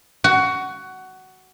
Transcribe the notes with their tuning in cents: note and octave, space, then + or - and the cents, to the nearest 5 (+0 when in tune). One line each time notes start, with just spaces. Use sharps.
F#4 +15